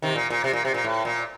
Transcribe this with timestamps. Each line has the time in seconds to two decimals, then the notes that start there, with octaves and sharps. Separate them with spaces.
0.02 C3 D#3
0.16 A#2
0.30 A#2
0.44 C3
0.53 A#2
0.65 C3
0.74 A#2
0.84 A2
1.05 A#2